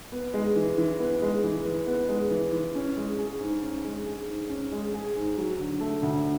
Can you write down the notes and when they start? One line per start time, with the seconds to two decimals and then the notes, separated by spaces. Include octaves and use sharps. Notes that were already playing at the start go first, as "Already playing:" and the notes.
0.12 B3
0.34 G#3
0.56 E3
0.78 E3
1.00 B3
1.22 G#3
1.43 E3
1.66 E3
1.87 B3
2.08 G#3
2.31 E3
2.52 E3
2.75 C#4
2.97 G#3
3.19 G#4
3.41 G#2
3.62 C#4
3.85 G#3
4.06 G#4
4.28 G#2
4.49 C#4
4.72 G#3
4.94 G#4
5.16 G#2
5.38 F#3
5.60 D3
5.80 A3
6.02 D2